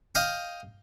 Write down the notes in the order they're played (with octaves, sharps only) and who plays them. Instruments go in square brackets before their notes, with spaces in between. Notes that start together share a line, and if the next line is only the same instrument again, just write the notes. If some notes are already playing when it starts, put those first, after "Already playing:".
[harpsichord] D#5 F5 G5